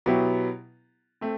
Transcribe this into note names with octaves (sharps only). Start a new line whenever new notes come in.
B2 F#3 B3 E4 G4
A3 C4